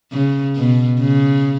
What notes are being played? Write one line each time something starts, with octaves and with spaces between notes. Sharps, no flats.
C#3
B2
C#3